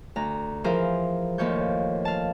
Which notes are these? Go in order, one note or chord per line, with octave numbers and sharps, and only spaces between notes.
D2 A#5
E3 F3 G#4 A#4 C5 E5
D#2 A2 F3 C#5 G6
F5 A5